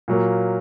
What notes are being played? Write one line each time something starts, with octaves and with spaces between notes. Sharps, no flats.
A#2 F#3 A#3